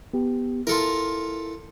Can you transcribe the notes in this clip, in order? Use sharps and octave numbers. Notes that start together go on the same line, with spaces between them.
B3 G4
E4 F4 A4 A#4